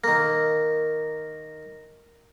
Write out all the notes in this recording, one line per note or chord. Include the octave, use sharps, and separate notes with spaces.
D#3 A#3 A#6